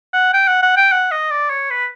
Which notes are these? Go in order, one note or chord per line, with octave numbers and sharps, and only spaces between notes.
F#5
G5
F#5
F#5
G5
F#5
D#5
D5
C#5
B4